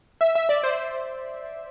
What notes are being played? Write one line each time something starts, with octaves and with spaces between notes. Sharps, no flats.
E5
E5
D5
C5